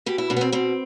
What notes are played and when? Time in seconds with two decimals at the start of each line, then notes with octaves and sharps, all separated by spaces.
0.06 B2 G4
0.18 E4
0.30 B2 D4
0.36 B3
0.41 C4
0.52 B2 C4